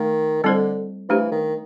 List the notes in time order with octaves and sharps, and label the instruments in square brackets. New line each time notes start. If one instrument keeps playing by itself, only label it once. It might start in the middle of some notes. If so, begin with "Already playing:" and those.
Already playing: [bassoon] D#3 [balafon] A3
[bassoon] D3 [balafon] G3 C4 E4 A4 C5
[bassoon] E3 [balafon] A3 D4 G4 C5
[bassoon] D#3